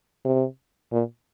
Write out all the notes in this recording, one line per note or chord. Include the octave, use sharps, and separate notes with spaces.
C3
A#2